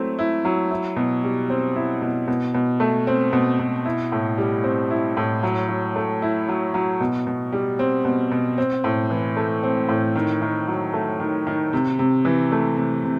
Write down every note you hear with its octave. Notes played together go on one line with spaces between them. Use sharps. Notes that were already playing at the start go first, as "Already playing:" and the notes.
Already playing: F#3 A3 C4 E4
E4
F#3
E4
B2
G3
C4
E4
B2
B2
B2
A3
C4
B2
B2
E4
A2
G3
C4
E4
A2
F#3
F#3
A3
E4
F#3
F#3
B2
B2
G3
C4
B2
B2
C4
A2
E3
A3
C4
A2
D#3
D#3
F#3
A3
D#3
D#3
C3
C3
E3
A3
C3
C3